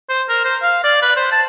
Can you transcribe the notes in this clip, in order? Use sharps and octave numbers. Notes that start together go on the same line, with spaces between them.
C5
A#4
C5
F5
D5
B4
C5
A5